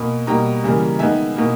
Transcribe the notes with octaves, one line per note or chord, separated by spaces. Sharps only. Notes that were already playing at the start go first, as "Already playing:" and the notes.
Already playing: B2 A#3 G#5 B5
B2 G3 A#3 G5 A#5
C#3 E3 G3 A#3
D#3 G#3 B3 E5 G#5
B2 A#3